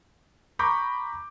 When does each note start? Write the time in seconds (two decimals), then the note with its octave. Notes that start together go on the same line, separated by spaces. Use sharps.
0.59 A#5 B5 C#6 D6 G6